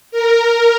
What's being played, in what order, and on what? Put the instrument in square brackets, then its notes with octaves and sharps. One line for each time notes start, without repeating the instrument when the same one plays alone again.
[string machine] A#4